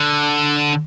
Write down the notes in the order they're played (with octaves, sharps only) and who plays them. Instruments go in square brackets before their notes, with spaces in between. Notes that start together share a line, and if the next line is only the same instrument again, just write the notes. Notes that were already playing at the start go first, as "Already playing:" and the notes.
Already playing: [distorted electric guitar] D3